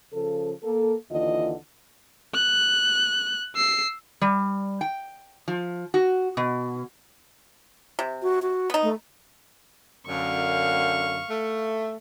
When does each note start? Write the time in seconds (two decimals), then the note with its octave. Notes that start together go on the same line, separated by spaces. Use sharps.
0.12 C#3 F3 A4
0.63 A#3 A4
1.09 D#2 D3 E3 F4 D#5
2.34 F#6
3.56 E6 C7
4.21 G3
4.81 G5
5.48 F3
5.94 F#4
6.37 B2
7.99 C3
8.23 F#4
8.42 F#4
8.70 B3 D#4
8.83 A3
10.07 F#2 D3 F5 C#6
11.29 A3